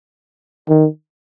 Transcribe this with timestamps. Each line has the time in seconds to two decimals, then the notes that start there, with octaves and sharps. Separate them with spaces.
0.69 D#3